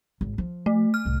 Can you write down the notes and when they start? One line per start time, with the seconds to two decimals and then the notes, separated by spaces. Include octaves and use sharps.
0.21 G#1
0.38 F3
0.66 A3
0.94 F6
1.05 C2 A2